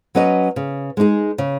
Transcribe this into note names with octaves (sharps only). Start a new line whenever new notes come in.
F#3 C#4 B4 D#5
C#3
G#3 D#4 G#4
C#3